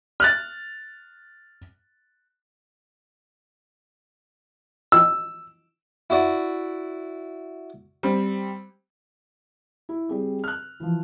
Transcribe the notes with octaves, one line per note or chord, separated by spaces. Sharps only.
F6 F#6 A6
E6
E4 F#4 D5
G3 C4
E4
G3 C4 G#4
F6 F#6
E3 F3